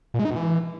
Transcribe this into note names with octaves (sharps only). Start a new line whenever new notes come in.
A#2
G#3
D#4
B2
E3